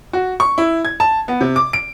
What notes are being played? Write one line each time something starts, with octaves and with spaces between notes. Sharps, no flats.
F#4
C#6
E4
G#6
A5
B3
C3
D6
D7